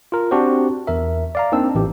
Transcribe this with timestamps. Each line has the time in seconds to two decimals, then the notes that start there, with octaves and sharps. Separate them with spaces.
0.12 F4 A#4
0.31 C4 D4 F#4 G4 C5
0.87 E2 A#4 E5
1.35 D5 F5 A#5
1.52 A#3 C4 D4 D#4 E6
1.75 A1 E3 G4